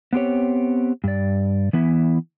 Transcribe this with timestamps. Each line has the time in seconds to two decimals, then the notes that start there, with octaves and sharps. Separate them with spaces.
0.13 B3 C4 G4 C#5
1.04 G2 D5
1.73 E3 B3 E4